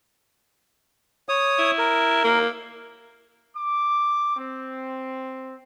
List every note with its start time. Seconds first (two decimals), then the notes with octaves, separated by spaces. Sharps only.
1.29 C#5 D#6
1.59 E4
1.78 A#4
2.24 A#3
3.56 D6
4.37 C4